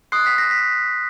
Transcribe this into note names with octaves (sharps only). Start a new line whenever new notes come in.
C6 D#6 F#6 C7
B6
A#6
B6